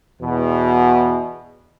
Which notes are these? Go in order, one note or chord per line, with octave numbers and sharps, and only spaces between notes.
E2 B2